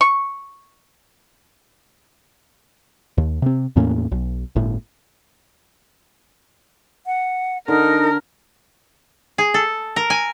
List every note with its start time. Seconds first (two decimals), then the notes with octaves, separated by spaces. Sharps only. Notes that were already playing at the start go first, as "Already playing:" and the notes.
0.01 C#6
3.18 D#2
3.42 C3 C4
3.76 E2 A2 A#3 C#4
4.12 B1
4.56 G1 A2
7.06 F#5
7.68 D3 D#4 A#4
9.38 G#4
9.54 A4
9.96 A#4
10.10 G#5